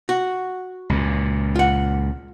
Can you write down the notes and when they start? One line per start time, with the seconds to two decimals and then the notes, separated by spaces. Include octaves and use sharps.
0.09 F#4
0.90 C#2 A#2
1.56 F4 F#5